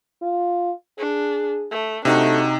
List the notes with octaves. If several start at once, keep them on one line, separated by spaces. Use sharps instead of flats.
F4
D4 G#4
A3
C3 A3 D4 D#4 F#4